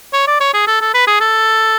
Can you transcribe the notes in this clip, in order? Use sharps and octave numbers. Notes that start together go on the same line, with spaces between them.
C#5
D5
C#5
G#4
A4
A4
B4
G#4
A4